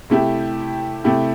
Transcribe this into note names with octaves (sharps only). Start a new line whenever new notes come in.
C3 A3 E4 G4
C3 A3 E4 G4